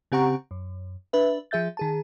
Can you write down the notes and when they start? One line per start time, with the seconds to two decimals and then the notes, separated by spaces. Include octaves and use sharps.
0.12 C#3 C4 G4 F#5 A#5 C#6
0.51 F#2
1.13 D4 B4 E5
1.51 F3 G#4 E5 G6 A6
1.77 D#3 G#4 A5